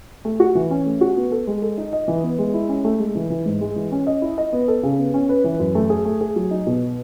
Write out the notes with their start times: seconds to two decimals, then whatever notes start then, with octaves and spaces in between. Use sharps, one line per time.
0.25 A3
0.40 F#4
0.55 E3
0.71 C#4
0.86 A3
1.01 F#4
1.17 B3
1.32 A4
1.47 G#3
1.62 A4
1.78 D#4
1.93 D#5
2.08 E3
2.23 B3
2.39 G#3
2.54 E4
2.69 C#4
2.85 A3
2.99 G#3
3.15 E3
3.30 E3
3.46 G#2
3.61 G#3
3.76 E3
3.92 C#4
4.07 D#5
4.22 E4
4.38 D#5
4.53 B3
4.68 A4
4.83 C#3
4.98 B3
5.14 C#4
5.29 B4
5.44 E3
5.60 F#2
5.75 A3
5.90 G#4
6.05 A3
6.21 G#4
6.36 F#3
6.51 D#4
6.67 B2